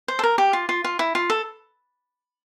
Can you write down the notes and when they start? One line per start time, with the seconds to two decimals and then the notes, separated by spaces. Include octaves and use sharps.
0.08 C5
0.19 A4
0.23 A#4
0.38 G4
0.53 F4
0.69 F4
0.84 F4
0.99 E4
1.15 F4
1.30 A4